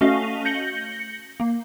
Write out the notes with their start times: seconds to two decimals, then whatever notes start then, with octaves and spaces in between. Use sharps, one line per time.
0.01 A3 C#4 F#4 D#5 F5
0.45 G6 A#6 C#7 F#7 G7
1.40 A#3